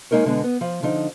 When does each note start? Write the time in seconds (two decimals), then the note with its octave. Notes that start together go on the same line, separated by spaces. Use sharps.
0.11 G#3 A#3 D#4 A#4 C#5
0.25 B2 D3 G#3 B3
0.44 B3
0.61 F3
0.82 D3 F3 D#4